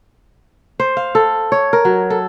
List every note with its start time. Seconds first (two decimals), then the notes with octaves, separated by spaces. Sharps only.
0.80 C5
0.97 F5
1.15 A4
1.52 C#5
1.73 A#4
1.85 F#3
2.10 A4